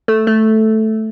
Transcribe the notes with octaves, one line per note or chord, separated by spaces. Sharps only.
A3
A3